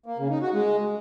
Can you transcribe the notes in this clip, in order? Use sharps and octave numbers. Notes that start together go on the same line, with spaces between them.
A#3
C#3
D#4
F#4
G#3